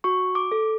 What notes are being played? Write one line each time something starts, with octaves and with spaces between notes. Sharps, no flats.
F#4 C#6
D6
A4